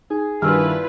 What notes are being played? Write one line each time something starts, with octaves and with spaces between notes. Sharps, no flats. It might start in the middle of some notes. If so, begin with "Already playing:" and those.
D#4 G#4
G2 D#3 E4 F4 B4 G#5 E6 F6